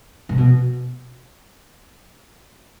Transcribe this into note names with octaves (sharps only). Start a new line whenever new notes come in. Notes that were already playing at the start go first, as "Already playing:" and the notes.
C3
B2